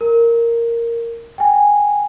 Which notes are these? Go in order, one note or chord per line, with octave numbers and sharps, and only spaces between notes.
A#4
G5 G#5